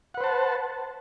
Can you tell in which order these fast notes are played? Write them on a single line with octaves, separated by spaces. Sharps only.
F#5 B4 C5 A5